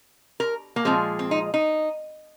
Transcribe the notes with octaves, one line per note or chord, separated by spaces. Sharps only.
A#4
A#3
A#2 F3 G#3 C4
C4
D#4
D#4